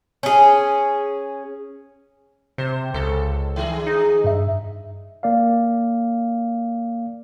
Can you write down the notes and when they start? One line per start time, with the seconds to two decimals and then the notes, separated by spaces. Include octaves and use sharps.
0.23 C#4 G#4
2.58 C3 C5
2.94 C#2 A4
3.56 D#3 G#4
3.87 D#4
4.24 G2 E5
5.23 A#3 D5 F5